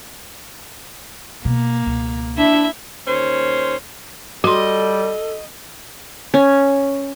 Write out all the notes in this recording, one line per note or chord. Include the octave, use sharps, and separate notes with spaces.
B2 A#3
C#2 B2
D4 E4 E5
D#2 C#4 C5
G3 F#4 A4 D#5 C6
C#4